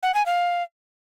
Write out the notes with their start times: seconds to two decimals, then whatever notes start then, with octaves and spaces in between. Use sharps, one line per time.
0.03 F#5
0.14 G#5
0.26 F5